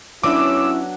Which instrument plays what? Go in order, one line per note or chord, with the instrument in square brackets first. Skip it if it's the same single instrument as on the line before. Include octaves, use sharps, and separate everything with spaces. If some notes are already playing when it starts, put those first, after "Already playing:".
[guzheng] F#3 B3 D4 [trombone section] C#4 E4 [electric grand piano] D6 [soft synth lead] E6